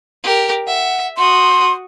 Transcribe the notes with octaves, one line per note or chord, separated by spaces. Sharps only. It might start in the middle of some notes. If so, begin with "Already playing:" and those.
G4 A#4
E5 F#5
F#4 C6 D#6